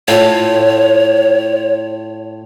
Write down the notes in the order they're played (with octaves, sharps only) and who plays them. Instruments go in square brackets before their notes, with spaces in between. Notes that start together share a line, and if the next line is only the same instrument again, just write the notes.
[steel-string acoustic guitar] A2 F4 [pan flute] C#5